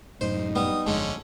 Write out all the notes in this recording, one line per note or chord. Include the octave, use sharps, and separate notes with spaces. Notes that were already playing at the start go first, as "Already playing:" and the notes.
F#2 A2 C3 D#4 C5
G3 B3 D#6
G1 F2 D3 G#3 C#4